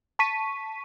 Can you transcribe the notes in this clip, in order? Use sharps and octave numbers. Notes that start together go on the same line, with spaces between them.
A5 C#6 B6 D#7